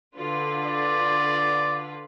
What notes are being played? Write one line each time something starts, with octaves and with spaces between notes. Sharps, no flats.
D3 F4 B4
D5